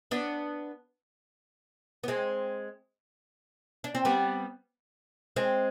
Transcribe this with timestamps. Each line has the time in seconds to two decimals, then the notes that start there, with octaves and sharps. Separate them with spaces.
0.11 B3 D4
2.04 B3
2.08 G#3 C4
3.84 D4
3.95 C4
4.05 G3 B3
5.36 G#3 C4